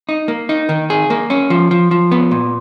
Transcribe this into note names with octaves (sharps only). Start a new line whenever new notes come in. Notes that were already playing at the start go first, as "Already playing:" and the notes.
D#4
A#3
D#4
D#3
G#4
A#3
C#4
F3
F3
F3
B3
A#2